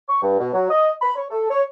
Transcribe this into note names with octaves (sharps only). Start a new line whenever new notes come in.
C#6
G2
B2
F#3
D#5
B5
C#5
A4
C#5